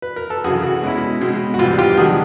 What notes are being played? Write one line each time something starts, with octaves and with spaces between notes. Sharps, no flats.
B4
A#4
A4
F#2 C#3 E3 F#4 G#4
F#4
B2 G#3 C#4 E4
B2 G#3 C4
F#4
G#2 E3 G3 F4
F4 G4
D#3 F#3 A3 D4 F#4 G#4